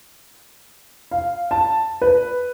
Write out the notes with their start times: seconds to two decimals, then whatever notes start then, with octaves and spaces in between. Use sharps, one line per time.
1.11 F5
1.51 A5
2.02 B4